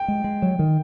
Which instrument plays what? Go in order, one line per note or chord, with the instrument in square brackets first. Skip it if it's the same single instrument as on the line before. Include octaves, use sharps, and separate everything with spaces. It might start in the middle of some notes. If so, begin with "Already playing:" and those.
Already playing: [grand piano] G5
[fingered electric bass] G#3
G#3
F#3
D#3